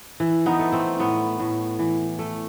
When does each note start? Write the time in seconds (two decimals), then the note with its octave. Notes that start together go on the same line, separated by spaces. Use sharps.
0.20 E3
0.46 B3 D#4
0.59 A3
0.72 A3 C4
0.99 A2 B3
1.40 A2
1.79 E3
2.19 A3